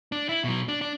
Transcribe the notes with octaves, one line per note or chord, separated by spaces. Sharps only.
D4
E4
B2 F#3
D4
D4